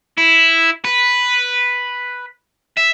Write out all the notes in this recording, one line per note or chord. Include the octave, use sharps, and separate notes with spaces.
E4
B4
E5